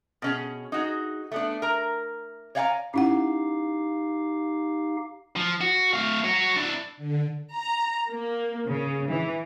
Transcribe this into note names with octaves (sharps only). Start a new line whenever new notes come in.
B2 C#4 G#4
D#4 F#4 G#4
A3 B3 D4
A#4 A#5
C#5 D5 F5 F#5 G#5 A#5
C#4 D#4 E4 G4 F5 F#5
F3
F#4
A3 F5
F#4 C#5
D4 E4
D3
A#5
A#3
C#3
E3